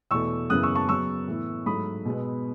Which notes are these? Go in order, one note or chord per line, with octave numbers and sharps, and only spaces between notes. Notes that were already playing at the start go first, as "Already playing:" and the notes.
E2 B2 A3 C#6 E6
F#2 C#3 E3 B3 D#6 F#6
C#6 E6
A5 C#6
C#3 F#3 B3 C#6 E6
A2 E3 B3
G#2 F#3 A3 B5 D#6
B2 G#3 B3